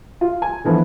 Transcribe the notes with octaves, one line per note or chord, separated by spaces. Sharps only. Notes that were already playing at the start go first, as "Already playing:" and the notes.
F4
G#5
D3 E3 F3 B3